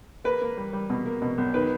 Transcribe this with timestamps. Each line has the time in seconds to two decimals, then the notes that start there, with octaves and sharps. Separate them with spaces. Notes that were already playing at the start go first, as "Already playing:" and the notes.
0.24 A#3 B4
0.41 A#3
0.57 G3
0.73 G3
0.90 B2
1.05 A#3
1.22 B2
1.38 B1
1.54 D#3 B4